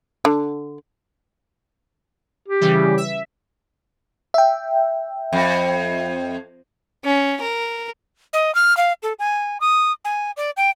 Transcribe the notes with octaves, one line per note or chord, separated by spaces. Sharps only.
D3
G4
C#3 E3 G3
E5
E5 G5
F2
C#4
A#4
D#5
F6
F5
A4
G#5
D#6
G#5
D5
G5